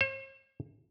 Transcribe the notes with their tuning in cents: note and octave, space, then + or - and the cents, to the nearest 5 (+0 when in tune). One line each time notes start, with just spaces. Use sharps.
C5 +45